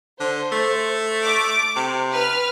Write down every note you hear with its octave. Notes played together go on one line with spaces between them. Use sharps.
D3 C5
A3
D6
C3
B4 F6